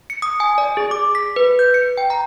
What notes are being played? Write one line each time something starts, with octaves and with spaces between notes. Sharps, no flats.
C#7
D#6
G#5
D5
G#4
D6
B6
B4
G6
C#7
G5
A#5